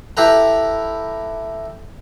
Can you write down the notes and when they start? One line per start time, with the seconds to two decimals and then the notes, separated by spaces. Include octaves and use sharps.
0.17 E4 G4 A4 B4 A#5